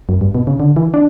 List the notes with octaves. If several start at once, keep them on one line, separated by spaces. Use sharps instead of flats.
F#2
G2
B2
C#3
D3
E3
D4